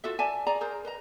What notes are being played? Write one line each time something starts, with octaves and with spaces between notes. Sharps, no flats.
F4 F#4 A4 E5
D5 E5 G#5 A5
G#4 D5 G#5 A#5
G#4 A#4 C5
B4 D#5 A#5